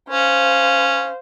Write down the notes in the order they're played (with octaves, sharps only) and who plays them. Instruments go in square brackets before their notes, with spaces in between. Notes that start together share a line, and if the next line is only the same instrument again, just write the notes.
[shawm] C#4 [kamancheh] C5 F5